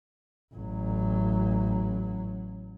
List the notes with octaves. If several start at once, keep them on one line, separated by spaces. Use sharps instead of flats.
A1 F#3